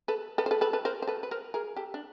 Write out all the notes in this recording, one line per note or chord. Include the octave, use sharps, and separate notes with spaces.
A4 B4
A4 B4
C5
A4 B4
A4 B4
A4 B4
A#4 C5
C5
A4 B4
B4
A#4 C5
G#4 A#4
G4 A4
D4